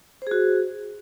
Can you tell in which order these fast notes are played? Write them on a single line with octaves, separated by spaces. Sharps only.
C5 G#4 F#4